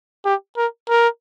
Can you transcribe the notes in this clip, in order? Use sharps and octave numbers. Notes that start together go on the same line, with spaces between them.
G4
A#4
A#4